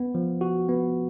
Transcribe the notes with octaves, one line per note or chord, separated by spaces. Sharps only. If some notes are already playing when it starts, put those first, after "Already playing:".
Already playing: B3
F3
F#4
B3